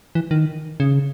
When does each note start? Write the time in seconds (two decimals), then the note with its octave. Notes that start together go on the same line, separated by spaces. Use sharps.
0.15 E3
0.31 D#3
0.80 C#3